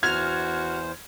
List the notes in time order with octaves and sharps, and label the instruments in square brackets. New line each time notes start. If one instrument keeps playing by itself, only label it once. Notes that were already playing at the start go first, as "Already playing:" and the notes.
[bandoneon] E2 C5 [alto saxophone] F#4 [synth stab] F6 [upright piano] G#6